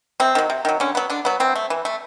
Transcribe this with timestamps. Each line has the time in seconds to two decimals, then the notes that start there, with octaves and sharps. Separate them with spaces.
0.20 C3 C4
0.35 D#3 F#3
0.50 C3
0.65 D#3 F#3
0.80 D3 C#4
0.95 F#3 B3
1.10 D3 D4
1.25 F#3 B3
1.40 E3 C4
1.55 A3
1.70 E3
1.85 A3